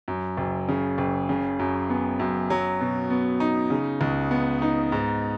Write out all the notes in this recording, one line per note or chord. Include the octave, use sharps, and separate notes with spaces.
F#2
F#1
C#3
F#1
C#3
F#2
B3
F#2
F#3
B2
B3
D#4
C#3
C#2
B3
D#4
G#2